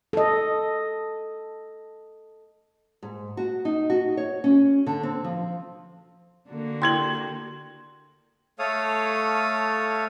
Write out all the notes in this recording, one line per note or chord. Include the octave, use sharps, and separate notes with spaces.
A4 D#5
G#2
F#4
D#4
F#4
C#5
C#4
D3
C4
F3
D3 A#3 F#4
G5 C6 G#6 F#7
A3 A4 C#5 F5 D#6